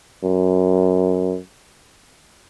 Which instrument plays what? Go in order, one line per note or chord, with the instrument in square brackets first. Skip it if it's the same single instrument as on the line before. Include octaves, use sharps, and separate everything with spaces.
[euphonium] F#2